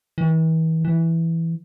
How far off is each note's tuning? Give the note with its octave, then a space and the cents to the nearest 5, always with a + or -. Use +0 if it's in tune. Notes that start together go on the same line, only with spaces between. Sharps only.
E3 -40
E3 +0